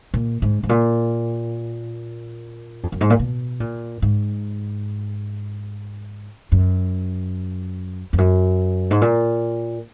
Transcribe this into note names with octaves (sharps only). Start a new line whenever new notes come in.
A#2
G#2
G#2
A#2
F2
F#2
G#2
A#2
B2
A#2
G#2
F#2
F2
F#2
G#2
A#2